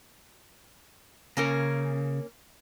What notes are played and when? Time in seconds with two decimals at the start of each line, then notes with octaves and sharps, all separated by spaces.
1.37 C#3 A#3 C#4 A#4